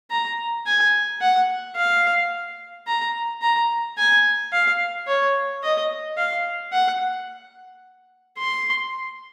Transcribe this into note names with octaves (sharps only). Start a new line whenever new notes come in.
A#5
G#5
F#5
F5
A#5
A#5
G#5
F5
C#5
D#5
F5
F#5
C6